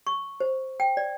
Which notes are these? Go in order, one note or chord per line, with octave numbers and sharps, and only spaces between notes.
C#6
C5
G5
D5